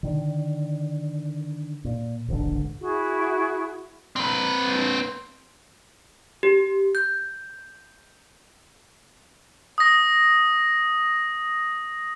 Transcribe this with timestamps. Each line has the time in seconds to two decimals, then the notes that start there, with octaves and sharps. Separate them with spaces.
0.03 D3 D#3
1.84 A#2
2.28 D#1 A1 G#2 D3
2.79 E4 F#4 G#4
4.16 C4 B4
6.43 G4
6.95 G6
9.78 D#6 A#6